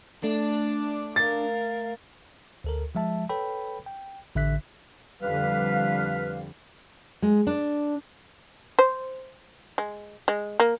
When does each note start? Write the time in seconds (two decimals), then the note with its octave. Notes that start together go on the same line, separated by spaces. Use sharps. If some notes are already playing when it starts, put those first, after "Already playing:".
0.24 A3 D4
1.16 A#4 F5 A6
2.64 D2 A4 A#4
2.95 F3 G#3 E5 A5
3.29 A4 B4 C#5 G5 B5
3.86 G5
4.35 A1 D3 E5 F#6 B6
5.22 F2 D3 G3 B4 F5
7.22 G#3
7.47 D4
8.79 C5
9.78 G#3
10.28 G#3
10.60 A#3